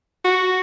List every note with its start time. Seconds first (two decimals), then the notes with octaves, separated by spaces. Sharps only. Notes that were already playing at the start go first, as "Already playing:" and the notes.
0.24 F#4